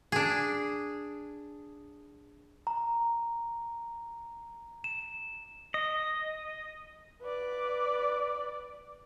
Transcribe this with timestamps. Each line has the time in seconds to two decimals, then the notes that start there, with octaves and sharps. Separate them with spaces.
0.12 D4 G#4
2.67 A#5
4.84 E7
5.74 D#5
7.21 B4 D5